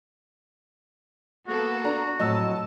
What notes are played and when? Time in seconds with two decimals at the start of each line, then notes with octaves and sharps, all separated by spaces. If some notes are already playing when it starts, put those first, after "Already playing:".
1.48 A#3 B3 F#4 A4
1.84 D4 A#5
2.19 F2 A2 F#3 D#5 A5 E6